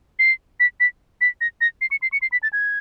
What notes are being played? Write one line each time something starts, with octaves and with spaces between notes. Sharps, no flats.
C7
B6
B6
B6
A#6
A#6
C7
C#7
C7
C#7
C7
B6
A6
G#6